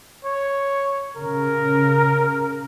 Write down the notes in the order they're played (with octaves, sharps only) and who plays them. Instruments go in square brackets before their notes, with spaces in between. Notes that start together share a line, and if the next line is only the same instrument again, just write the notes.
[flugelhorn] C#5
[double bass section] C#3 [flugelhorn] A#4